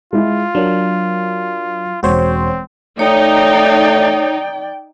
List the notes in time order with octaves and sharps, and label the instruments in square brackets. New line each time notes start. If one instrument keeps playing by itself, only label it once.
[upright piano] G#3 E4 [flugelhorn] F4
[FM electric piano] F#3 [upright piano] D4 A#4
[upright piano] E1 [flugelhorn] C4 [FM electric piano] F#4 C5 C#5
[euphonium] A3 [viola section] D#4 [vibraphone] C#5 [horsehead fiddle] D5 G5